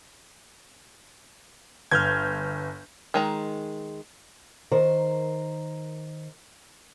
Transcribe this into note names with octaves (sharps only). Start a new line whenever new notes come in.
G1 F6 G6 G#6
D#3 G#3 A#5
D#3 A#4 C5